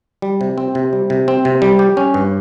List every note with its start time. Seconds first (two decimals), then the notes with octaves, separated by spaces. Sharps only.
0.22 G3
0.41 C3
0.58 C4
0.75 C3
0.93 G3
1.10 C3
1.28 C4
1.45 C3
1.62 G3
1.79 G4
1.97 C#4
2.14 G2